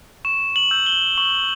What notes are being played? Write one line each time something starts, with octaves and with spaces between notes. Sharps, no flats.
C#6 E7
F#7
E6 G6
G7
C#6 F#7